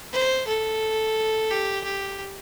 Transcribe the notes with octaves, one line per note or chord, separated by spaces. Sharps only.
C5
A4
G4
G4